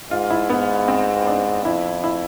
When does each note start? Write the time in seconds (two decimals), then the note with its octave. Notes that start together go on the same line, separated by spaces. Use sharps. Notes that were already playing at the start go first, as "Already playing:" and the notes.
0.11 G#2 F4
0.30 E4
0.50 G#2 B3
0.88 C4
1.27 D4
1.65 F2 E4
2.04 E4